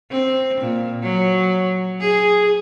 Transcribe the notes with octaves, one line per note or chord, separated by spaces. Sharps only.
C4
A#2
F#3
G#4